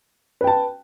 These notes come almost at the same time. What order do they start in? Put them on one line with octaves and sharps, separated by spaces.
B4 G5 A5